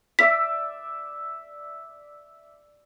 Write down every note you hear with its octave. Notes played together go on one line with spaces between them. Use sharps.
D5 E5 E6 B6